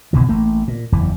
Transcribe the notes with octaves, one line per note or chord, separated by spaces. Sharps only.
F#1 B2 D#3 E3
A1 A3 A#3
A#2
F#1 E2 E3